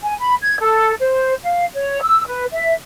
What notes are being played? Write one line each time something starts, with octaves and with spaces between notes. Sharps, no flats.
G#5
B5
G#6
A4
C5
F5
C#5
E6
B4
E5